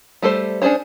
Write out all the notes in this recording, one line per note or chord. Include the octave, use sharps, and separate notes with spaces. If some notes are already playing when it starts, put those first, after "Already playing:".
G3 A3 A4 C5
C#4 D4 G#4 C5 C#5